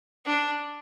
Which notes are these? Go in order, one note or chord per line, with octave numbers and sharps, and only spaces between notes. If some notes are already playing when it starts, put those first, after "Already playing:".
D4